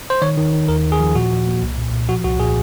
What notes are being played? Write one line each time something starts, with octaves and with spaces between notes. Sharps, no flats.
C5
D#3 C#5
D#3
D#3
D#2 A#4
D#2
G#4
F3
A#2 F#4
F3
A#3
C2
A#2
A#2
F3 F#4
C2 F#4
A#2 G#4